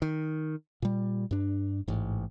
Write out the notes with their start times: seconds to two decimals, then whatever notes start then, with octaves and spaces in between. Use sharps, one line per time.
0.02 D#3
0.82 A#2 G3
1.31 G2 D4
1.88 A1 G#2